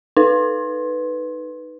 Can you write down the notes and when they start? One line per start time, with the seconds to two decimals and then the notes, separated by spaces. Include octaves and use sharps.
0.17 D#4 B4